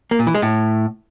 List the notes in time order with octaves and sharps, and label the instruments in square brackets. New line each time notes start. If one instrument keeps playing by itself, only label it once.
[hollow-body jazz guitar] A#3
A#2
E3
G#3
A2